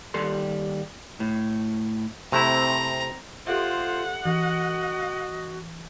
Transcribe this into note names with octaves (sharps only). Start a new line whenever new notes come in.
D#2 G3 A4 C6
A2
C3 A3 C4 E4 A#5
F4 G4 A4 C5 E5 F#5
E3 F#4 D#5 F#7